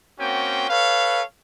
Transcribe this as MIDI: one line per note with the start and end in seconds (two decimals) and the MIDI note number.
0.19 0.68 58
0.19 0.68 60
0.19 0.68 61
0.19 0.68 66
0.19 0.68 79
0.69 1.22 69
0.69 1.22 71
0.69 1.22 73
0.69 1.22 77